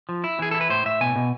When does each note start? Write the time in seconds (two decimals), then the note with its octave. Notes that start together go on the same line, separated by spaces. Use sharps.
0.09 F3
0.24 E4
0.39 E3 G#4
0.51 E4 A4
0.61 B4
0.70 A2 C5
0.85 A2 E5
1.01 B2 G#5
1.16 B2